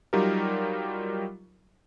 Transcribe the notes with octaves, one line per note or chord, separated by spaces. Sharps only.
F#3 G3 D#4 F4 G4 A#4